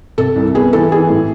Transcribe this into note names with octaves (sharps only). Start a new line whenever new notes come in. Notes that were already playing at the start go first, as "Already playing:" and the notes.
C3 A4
C2
B3 G#4
E3 A4
E3 G#4
A2